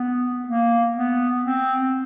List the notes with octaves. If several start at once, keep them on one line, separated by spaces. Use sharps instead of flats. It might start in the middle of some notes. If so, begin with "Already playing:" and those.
Already playing: B3
A#3
B3
C4